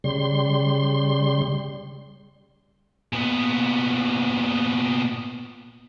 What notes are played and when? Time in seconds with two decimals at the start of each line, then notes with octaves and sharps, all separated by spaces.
0.04 C#3 G3 C6
3.13 A#2 B3